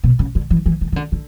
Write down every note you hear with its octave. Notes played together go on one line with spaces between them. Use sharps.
B2
C#3
D3
E3
E3
D#3
D#3
D3
D3